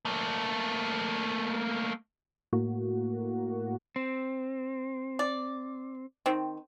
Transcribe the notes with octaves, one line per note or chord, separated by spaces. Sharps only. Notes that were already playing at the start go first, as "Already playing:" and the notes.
A3 A#3
A2 A#3 F#4
C4
D5
D#3 C4